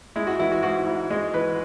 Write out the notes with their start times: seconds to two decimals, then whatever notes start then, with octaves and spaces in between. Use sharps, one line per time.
0.16 G#3 E4
0.27 F#4
0.39 E3 E4
0.52 F#4
0.63 G#2 F#4
0.87 G#2 E4
1.10 G#3 D#5
1.34 E3 B4